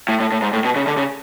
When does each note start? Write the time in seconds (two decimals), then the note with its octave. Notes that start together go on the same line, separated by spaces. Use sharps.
0.08 A2
0.20 A2
0.32 A2
0.42 G#2
0.53 A2
0.65 B2
0.76 C#3
0.87 D3
0.97 C#3